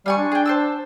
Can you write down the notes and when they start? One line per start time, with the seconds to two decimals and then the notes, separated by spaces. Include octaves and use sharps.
0.06 G3 F4 G#5 C#6
0.18 D4
0.32 G#4 G5
0.46 C5 A5 E6